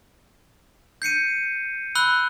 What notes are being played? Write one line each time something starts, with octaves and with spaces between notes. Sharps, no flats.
G6 C7 C#7 D#7
B5 E6 F#6 G7